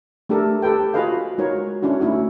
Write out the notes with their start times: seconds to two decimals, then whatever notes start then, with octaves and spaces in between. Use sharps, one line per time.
0.29 A3 D4 G4 A4 A#4
0.62 G4 A4 B4 G5
0.94 F4 F#4 G#4 B4 D#5 F5
1.38 G#3 D#4 F#4 A#4 C#5
1.83 C#4 D4 E4 F#4
2.01 A3 D#4 E4 F#4